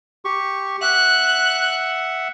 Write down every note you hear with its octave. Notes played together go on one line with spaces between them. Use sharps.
G4 C#6
E5 F#5 F#6